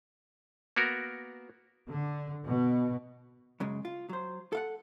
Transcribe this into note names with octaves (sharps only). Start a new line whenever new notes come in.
A#3 B3 F#4 A#4
D3
B2
F#2 C#3 G#3
F4
F#3 C5
A4 F5 F#5